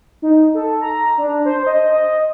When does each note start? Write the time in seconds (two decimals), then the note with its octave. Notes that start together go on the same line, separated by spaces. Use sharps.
0.22 D#4
0.54 A4
0.81 A#5
1.18 D4
1.45 C5
1.66 D#5
1.92 D#5